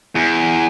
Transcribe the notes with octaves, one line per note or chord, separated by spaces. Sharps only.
E2